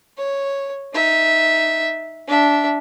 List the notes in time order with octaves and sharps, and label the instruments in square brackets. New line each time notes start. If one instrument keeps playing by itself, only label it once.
[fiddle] C#5
D#4 E5
D4 E5